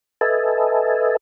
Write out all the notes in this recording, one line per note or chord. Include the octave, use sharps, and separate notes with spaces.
A4 B4 D#5 E5 G#5 A5